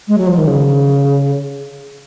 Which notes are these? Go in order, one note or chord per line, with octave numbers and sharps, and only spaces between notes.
G#3
F#3
F3
D#3
C#3